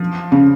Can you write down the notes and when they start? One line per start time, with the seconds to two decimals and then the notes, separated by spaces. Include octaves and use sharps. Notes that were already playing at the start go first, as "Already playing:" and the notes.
Already playing: F3
0.32 C#3